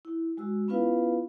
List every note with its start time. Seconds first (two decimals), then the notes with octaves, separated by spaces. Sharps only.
0.05 E4
0.37 G#3 F#4 E6
0.68 B3 C#4 E4 F4 B4 F5